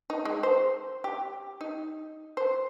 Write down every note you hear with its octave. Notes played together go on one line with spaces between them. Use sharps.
D#4
G#3
C5
G4
D#4
C5